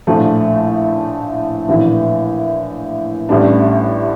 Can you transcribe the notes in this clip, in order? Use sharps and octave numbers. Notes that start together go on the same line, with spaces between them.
A#1 A2 F3 A3
A#1 A2 E3
A1 A2 G3 D4